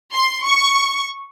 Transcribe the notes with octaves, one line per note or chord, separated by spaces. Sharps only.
C6
C#6